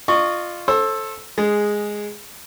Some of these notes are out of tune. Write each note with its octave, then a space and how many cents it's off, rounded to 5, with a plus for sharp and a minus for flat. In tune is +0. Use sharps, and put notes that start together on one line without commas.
F4 -5 D#5 -45 C#6 +0
A4 +0 C5 +35 E6 +0
G#3 +0 G#4 -10